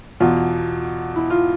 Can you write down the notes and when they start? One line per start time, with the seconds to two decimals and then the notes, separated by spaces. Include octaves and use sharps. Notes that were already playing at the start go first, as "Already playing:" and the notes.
0.20 E2 B2 F4
1.16 E4
1.30 F4